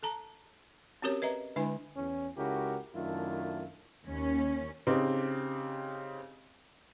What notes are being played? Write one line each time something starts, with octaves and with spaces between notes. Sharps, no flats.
A4 A5 A#5
C4 C#4 F#4 G4 A#4 C#5
B4 D#5 E5 A#5
D3 G#3 D4 E4 B4 G#5
E2 C#4
C#2 C#3 E4 F#4 G4 A#4
F#2 D#3 A3 D4 E4 F4
D#2 C#4
C#3 C4 D#4 G4